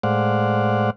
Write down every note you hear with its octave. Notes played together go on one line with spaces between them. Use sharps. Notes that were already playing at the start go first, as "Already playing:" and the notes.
A2 G#3 C5 D5 F5 F#5